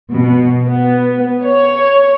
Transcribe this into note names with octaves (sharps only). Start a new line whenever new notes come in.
B2
B3
C#5